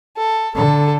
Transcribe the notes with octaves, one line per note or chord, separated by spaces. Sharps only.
A4
D3 A4